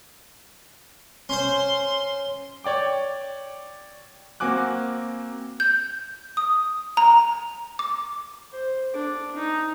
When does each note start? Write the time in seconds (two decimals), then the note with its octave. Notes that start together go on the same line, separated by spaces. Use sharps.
1.29 C#4 C5 C6
2.64 C#5 D5 G5 D6
4.40 A#3 C4 F#4 G#5 D6 F#6
5.60 G6
6.37 D#6
6.97 A#5
7.79 D6
8.52 C5
8.93 D4
9.36 D#4